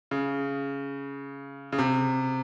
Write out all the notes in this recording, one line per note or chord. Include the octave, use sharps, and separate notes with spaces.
C#3
C#3
C3